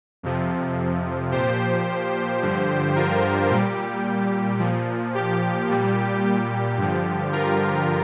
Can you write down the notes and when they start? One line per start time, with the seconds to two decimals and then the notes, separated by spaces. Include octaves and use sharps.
0.23 F2 C3 F3
1.32 A#2 F3 G4 C5
2.42 G2 D3 F3
2.96 F4 A#4
3.50 A#2 G3 G4
4.59 A#2 F3
5.15 G4
5.69 A#2 G3
6.23 G4
6.78 G2 D3 F3
7.32 F4 A#4